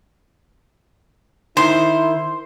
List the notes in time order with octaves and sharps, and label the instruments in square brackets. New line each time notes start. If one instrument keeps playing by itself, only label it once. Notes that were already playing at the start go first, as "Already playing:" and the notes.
[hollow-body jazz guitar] D#3 [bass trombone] E4 [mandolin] C5 [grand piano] C6